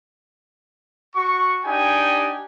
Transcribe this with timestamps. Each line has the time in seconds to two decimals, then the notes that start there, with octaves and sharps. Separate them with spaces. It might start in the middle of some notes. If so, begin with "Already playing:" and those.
1.14 F#4 C#6
1.64 D4 D#4 G4 G5 G#5